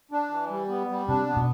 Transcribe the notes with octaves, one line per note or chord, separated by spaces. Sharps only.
D4
E3
G3
B3
G3
C3 D4
B3
B2